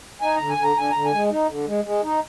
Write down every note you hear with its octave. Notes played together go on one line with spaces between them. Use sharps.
D#4 G#5
D3 A#5
G#5
D3
A#5
D3 G#5
D3 A#5
G#5
G#3
D#4
D3
G#3
G#3
D#4